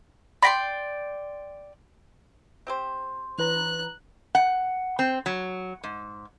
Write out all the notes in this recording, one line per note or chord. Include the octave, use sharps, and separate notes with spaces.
D5 G5 B5 C6 A#6 B6
C4 G4 C5
E3 B4 A#5 F#6
F#5
C4
F#3
G#2